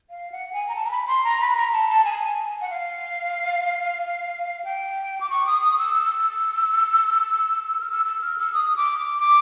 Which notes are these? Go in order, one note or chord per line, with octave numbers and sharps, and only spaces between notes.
F5
F#5
G#5
A#5
A5
A#5
B5
C6
A#5
B5
A#5
A5
A5
G#5
F#5
F5
G5
D6
C#6
D#6
D#6
E6
E6
F6
E6
E6
F6
E6
D#6
D6
D6